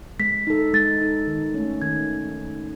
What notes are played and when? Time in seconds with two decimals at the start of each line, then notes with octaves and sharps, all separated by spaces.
0.19 G#3 B6
0.47 D#4 A4
0.74 G#3 A6
1.01 D#4 A4
1.27 D#3
1.54 A3 C#4
1.82 D#3 G#6